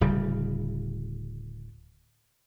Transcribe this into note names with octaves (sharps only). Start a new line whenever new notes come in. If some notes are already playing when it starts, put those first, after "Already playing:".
D1 C#3 G3